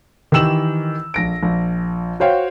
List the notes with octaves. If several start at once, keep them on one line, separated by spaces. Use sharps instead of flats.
D#3 E3 G4 E6 E7 F#7
A#1 A#6 D7
A#1
F#4 C5 C#5 F5 G5